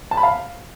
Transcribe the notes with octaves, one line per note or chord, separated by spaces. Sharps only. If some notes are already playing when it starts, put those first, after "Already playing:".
A5
B5
F5